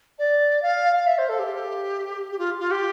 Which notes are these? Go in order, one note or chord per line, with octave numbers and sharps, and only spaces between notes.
D5
F5
F5
E5
C5
A4
G4
G4
F4
F4
G4